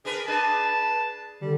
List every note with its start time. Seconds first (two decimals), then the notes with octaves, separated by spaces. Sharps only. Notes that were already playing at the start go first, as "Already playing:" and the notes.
0.05 D4 G#4 A#4 B4
0.28 D4 G#4 B4 A5
1.42 D3 G3